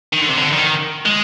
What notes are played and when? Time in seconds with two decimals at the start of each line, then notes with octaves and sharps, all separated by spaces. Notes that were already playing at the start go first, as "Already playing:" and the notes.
0.13 D#3
0.21 D3
0.29 C3
0.37 D3
0.52 D#3
1.06 G#3